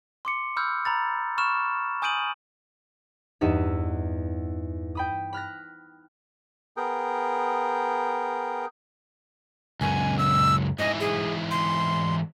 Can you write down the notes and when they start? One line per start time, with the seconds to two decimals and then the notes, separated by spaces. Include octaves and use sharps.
0.25 C6 D6 C#7
0.56 B5 D6 E6 F6 G6
0.85 A#5 B5 A6
1.38 B5 C#6 F6 E7
2.02 G#5 D#6 G6 D7 D#7 F#7
3.41 E2 G2 B3 D#4 E5
4.95 G5 B5 D#6
5.33 B5 F6 F#6 A#6
6.77 B3 G#4 A#4 G5
9.81 C#2 F#2 G#5
10.19 E6
10.79 G#2 E3 D#5
11.00 G#4
11.51 C6